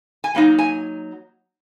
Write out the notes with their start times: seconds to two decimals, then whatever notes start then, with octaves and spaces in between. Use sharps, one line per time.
0.24 G#5
0.35 F#3 A#3 D#4 G5
0.59 G#5